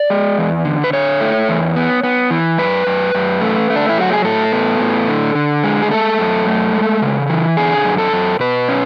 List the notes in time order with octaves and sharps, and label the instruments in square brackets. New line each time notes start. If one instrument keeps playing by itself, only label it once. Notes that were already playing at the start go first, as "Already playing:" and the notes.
Already playing: [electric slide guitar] D5
G#3
E2
D3
B4
D3 C#5
A3
E2
B3
B3
E3
F#2 B4
F#2
F#2
A3
A3
D4
E4
F#3 F#4
G#4
A2 A4
B3
A2
D3
D3
G#3
G#4
A3 A4
F#2
A3
G#3
C#3
E3
D3 G#4
F#2
A4
F#2
B2 B4
C#4